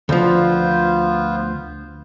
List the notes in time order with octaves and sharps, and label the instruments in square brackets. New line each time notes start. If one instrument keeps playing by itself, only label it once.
[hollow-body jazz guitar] D2 F3 [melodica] B3 F4 C5